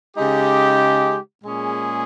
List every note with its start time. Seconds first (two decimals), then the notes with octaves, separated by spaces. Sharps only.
0.17 C#3 G#3 D#4 G4
1.43 A#2 G#3 C#4 G#4